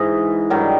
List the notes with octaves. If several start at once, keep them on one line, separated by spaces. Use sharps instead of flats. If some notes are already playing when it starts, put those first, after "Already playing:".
Already playing: G#2 E3 D#5
G2 D#3 F#3